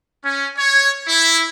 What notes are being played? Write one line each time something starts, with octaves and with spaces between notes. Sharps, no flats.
C#4
C#5
E4